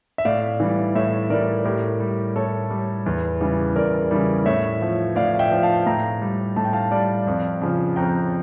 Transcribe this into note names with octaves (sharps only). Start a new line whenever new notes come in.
E5
A2 D5 F5
E3 G3
A2 C#5 E5
E3 G3 A#4 D5
A2 G4 A#4
G3
A2 A4 C#5
G3
E2
C#3 E3 G3
E2 A#4 D5
C#3 E3 G3
A2 C#5 E5
F3
A2 D5 F5
F5
E5 G5
F3
F5 A5
A2 G5 A#5
G3
A2 A5
G5
F5 A5
G3 D5 F5
F2
C#3 F3
F2 G5 A#5